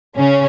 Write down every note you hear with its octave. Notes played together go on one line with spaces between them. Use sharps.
C#3 C#4